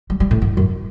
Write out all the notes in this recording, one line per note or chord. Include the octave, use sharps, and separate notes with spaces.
G3
G3
A2
G2
F#2